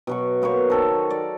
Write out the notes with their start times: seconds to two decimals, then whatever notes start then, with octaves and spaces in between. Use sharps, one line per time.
0.07 B2 F#3 C#6
0.42 A#3 B3 C5 C#5
0.70 D#3 A4 A#4
1.10 D5